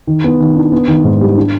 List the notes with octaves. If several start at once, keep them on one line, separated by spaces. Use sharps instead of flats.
D#3
B3
D#3
D4
B3
D#3
G#2
G3
D4